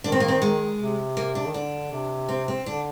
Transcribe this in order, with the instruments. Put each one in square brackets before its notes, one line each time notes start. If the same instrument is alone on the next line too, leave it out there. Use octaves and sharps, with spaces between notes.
[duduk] D#3 [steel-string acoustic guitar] D4
[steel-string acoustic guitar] C4
A#3
C4
G#3
[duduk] C3
[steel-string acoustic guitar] A#3
D4
[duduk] D#3
[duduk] D3 [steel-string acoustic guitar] D4
[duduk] C3
[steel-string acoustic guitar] C4
C4
[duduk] D3 [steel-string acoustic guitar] D4